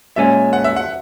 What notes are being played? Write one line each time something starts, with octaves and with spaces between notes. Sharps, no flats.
A#2 G#3 C#4 E5
F#5
E5
F#5